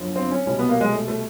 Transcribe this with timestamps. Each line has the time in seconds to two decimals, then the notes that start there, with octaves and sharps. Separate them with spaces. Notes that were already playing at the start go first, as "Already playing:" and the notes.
Already playing: G1 F#2 D3 F3
0.16 C4
0.31 C#4
0.46 C2 B2 C#4
0.59 B3
0.69 A#3
0.81 G#3
0.92 A3
1.08 A3